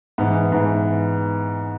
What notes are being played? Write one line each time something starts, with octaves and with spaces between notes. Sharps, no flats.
G#2 E3 B3
G#2 E3